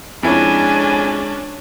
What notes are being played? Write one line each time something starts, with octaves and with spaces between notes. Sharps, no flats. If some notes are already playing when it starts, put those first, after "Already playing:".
F2 G#3 C#4 D4 E4 G#5